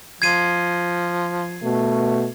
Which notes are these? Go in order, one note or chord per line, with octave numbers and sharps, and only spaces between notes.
F3 G#6 C7 D#7
B2 A3